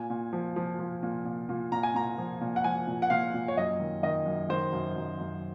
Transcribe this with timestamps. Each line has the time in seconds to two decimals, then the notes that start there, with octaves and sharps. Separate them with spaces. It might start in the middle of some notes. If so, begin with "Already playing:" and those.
Already playing: A#2 G#5
0.10 A#2
0.33 F3
0.56 F3
0.79 F3
1.03 A#2
1.25 A#2
1.49 A#2
1.72 A#2 A#5
1.83 G#5
1.95 A#2 A#5
2.18 F3
2.41 A#2
2.56 F#5
2.64 F3 G#5
2.87 A#2
3.02 F#5
3.10 A#2 F5
3.34 A#2
3.48 C#5
3.57 F#2 D#5
3.80 D#3
4.03 D#3 D#5
4.26 F#2
4.49 D#3 C5
4.73 F#2
4.96 F#2
5.19 F#2